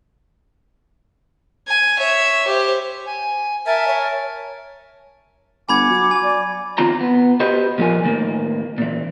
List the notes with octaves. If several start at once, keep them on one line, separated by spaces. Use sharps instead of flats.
G#5
C#5 E5
G4 C5
G#5
A#4 E5 G#5 A5
C#5
G1 F#5 G#5 B5 D6 G#6
F#3
G#5
D5 D6
D#3 C4 F4 A#5
B3
F#4 G4 B4 C5 D#5
A#2 F3 G#3 G#4 A#4 G#5
A2 D#3 A#3
A#2 E3